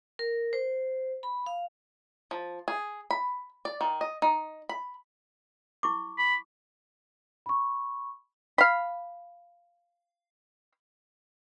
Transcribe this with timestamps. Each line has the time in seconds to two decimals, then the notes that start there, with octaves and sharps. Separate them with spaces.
0.19 A#4
0.53 C5
1.23 B5
1.46 F5
2.31 F3
2.68 G#4
3.11 B5
3.65 D5
3.81 D#3
4.01 D#5
4.22 D#4
4.69 B5
5.83 E4 C#6 D6
6.18 B5
7.46 B5 C#6
8.58 F5 B5